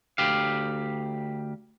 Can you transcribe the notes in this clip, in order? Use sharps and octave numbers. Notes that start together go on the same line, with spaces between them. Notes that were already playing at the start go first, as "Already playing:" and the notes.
D2 G4 F5